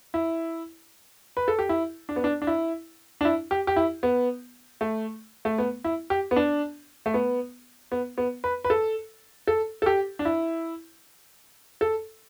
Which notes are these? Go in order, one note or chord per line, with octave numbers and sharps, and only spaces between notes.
E4
B4
A4
G4
E4
D4
B3
D4
D4
E4
D4
E4
G4
G4
E4
B3
A3
A3
B3
E4
G4
B3
D4
A3
B3
B3
B3
B4
B4
A4
A4
A4
G4
D4
E4
A4